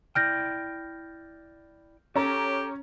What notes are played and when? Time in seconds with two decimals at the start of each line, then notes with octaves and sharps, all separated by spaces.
0.15 E4 D5 G5 F6 G6 A#6
2.16 C#4 G4 A4 A#5